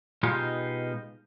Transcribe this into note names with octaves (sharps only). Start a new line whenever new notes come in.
B2 G#3 B3 D#4 F4 G4